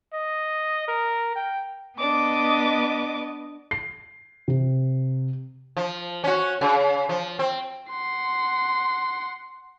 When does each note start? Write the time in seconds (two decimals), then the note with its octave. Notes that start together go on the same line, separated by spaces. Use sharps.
0.13 D#5
0.88 A#4
1.35 G5
1.99 B3 D4 D#5 D6
3.71 C7
4.48 C3
5.77 F3
6.24 C#4 F#4
6.61 C#3
7.09 F3
7.39 C4
7.91 F#5 C6